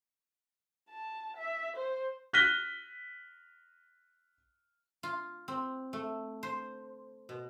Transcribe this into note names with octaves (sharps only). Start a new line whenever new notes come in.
A5
E5
C5
F6 F#6 A#6 B6 D#7 G7
F4
C4
A3
C5
B2